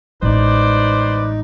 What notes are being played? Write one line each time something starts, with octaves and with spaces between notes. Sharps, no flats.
A1 G#3 D#4 B4 C5 D5